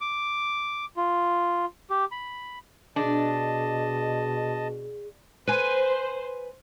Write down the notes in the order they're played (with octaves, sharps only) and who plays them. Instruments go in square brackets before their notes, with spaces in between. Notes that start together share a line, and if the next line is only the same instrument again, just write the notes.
[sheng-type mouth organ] D6
F4
G4
B5
[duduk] B2 [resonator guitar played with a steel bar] D4 [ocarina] G#4 [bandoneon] D#5 A5
[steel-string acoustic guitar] B4 G#5 [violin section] C5